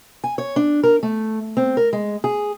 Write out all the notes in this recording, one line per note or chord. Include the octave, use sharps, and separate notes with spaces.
G#5
C#5
D4
A#4
A3
C4
A#4
G#3
G#4